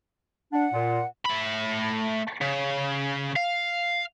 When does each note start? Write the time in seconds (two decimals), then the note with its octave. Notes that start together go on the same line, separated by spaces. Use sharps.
0.53 D4 F#5
0.73 A#2
1.26 A3 B5
2.41 C#3
3.36 F5